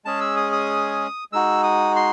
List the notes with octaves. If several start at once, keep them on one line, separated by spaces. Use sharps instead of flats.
G#3 C#4 G#4 A5
E6
D#6
D#6
G#3 D#4 F#4 E6
D#6
C6